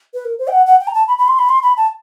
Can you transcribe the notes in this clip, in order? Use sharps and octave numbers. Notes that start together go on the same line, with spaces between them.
B4
A#4
C5
G5
F#5
F#5
G5
A#5
A5
B5
B5
C6
B5
C6
B5
A5